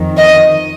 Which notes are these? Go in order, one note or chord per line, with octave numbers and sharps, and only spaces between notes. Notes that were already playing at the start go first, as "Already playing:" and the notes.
Already playing: F2 D#3
D#5